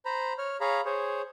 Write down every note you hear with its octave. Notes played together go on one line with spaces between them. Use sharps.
C5 A#5 B5
C#5 F6
G#4 C#5 F5 A#5 B5
G#4 C5 C#5